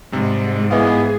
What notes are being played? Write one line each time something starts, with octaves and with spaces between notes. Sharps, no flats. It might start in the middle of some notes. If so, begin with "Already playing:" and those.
G#2 C3 G3
E3 B3 G#4 D#5 F5